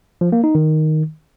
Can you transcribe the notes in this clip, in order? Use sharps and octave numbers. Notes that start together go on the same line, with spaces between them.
F3
A#3
D#4
D#3